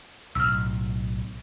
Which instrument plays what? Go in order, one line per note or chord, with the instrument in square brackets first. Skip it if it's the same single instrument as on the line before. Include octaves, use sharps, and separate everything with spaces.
[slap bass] B1 A2 [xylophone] E6 F6